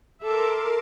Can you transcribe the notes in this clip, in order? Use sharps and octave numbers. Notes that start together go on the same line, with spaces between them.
A4 A#4 E5 C6 D6